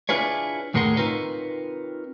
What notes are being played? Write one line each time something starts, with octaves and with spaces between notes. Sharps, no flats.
D4 E4 F4 G#4 B4 C#5
D#2 A2 G#4 A#4 F#5 C6
C4 D#4 F4 A#4 B4 C#5